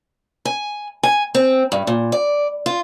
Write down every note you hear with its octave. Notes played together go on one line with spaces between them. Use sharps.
G#5
G#5
C4
G2
A#2
D5
F4